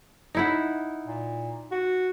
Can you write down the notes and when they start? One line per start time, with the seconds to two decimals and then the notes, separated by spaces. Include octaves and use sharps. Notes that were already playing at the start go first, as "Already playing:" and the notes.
0.35 D#4 E4 F#5
1.07 A#2
1.71 F#4